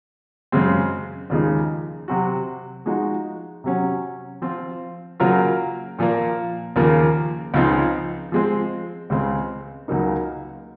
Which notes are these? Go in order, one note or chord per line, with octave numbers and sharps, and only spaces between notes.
F#2 C#3 G#3 C4
D#2 C#3 F3 G#3 D#4
C3 F#3 C4 F#4
F3 G#3 D#4 F#4
C3 F#3 C#4
F3 C4 F4
C#3 F#3 A#3 F4 A#4
A#2 F3 A#3
D#2 C#3 F3 A#3
C#2 C#3 F3 C4 D#4
F3 G#3 C4
C#2 C#3 G#3 C4
C#2 C#3 F#3 A#3 D#4